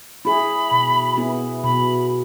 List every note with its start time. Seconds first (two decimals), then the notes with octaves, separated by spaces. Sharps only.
0.25 E4 G#4 B5
0.71 B2
1.17 B3 E4 G#4
1.64 B2 B5